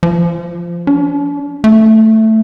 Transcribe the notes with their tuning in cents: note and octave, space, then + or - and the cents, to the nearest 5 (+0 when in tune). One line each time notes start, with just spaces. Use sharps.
F3 -15
D4 -40
A3 +5